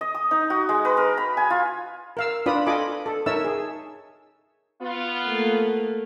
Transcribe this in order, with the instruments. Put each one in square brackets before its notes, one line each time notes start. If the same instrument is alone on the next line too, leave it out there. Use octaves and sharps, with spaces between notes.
[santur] D#5
D#6
D#4
F#4
G#3
B4
A#4
B5
G#5
F4
[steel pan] A#4 F5 E6
D4 F4 B4 D5 B5 D#6
F4 A4 D#5 G#5 B5 D6
A4
D#4 A#4 C#5 E5 A5 E6
G#4
[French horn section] B3 F4
[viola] A3 A#3